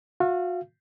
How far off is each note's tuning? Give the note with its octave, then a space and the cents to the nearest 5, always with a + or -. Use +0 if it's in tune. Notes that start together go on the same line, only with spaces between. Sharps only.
F#4 -40 F5 -30